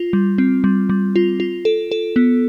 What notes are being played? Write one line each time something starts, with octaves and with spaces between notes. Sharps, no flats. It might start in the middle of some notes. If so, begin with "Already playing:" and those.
Already playing: F4
G3
C4
G3
G3
F4
F4
A4
A4
B3